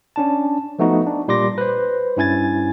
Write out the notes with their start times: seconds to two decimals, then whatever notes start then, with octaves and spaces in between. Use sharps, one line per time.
0.16 C#4 D4 A5
0.79 F3 A3 B3 D#4 F#4
1.06 D4
1.28 A#2 G3 C6 D6 A#6
1.58 B4 C5
2.17 G2 C#4 E4 G#5 G#6 A6